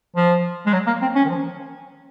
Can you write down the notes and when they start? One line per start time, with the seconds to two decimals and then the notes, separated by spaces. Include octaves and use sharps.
0.16 F3
0.66 G#3
0.73 F#3
0.87 A#3
1.02 C4
1.15 C#4
1.25 D#3
1.29 F3